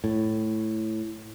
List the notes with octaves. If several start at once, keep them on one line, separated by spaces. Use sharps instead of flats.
A2